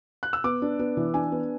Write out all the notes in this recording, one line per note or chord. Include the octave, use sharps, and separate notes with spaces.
F#6
E6
B3 D6
D4
B3
E3
D4 G#5
B3